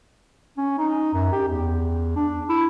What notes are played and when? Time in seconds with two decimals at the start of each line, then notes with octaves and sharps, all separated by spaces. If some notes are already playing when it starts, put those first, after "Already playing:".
0.58 C#4
0.78 D#4
1.14 F#2
1.32 G4
1.49 E2
2.16 D4
2.49 E4